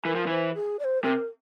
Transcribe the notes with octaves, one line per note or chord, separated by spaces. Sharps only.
E3 A#4
F3
E3 C5
G#4
D5
C5
C3 A#4